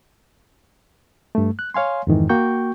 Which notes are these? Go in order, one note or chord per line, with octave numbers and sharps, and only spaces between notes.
G2 A3
F#6
C#5 F5 G#5 C6
F2 G#2 D#3 E3
A#3 F#4 G5 C#6 G6